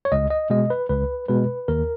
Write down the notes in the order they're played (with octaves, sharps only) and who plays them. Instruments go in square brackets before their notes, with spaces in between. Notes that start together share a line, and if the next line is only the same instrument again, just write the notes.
[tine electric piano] C#5
C#2 D#5
D#5
B2 G#3 D#5
B4
C#2 B4
B2 G#3 B4
D#2 A#4